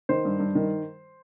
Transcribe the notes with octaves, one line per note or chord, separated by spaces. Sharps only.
D#3 C5
G2
G2
D#3